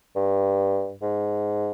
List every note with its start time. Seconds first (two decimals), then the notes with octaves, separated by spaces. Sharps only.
0.16 G2
1.02 G#2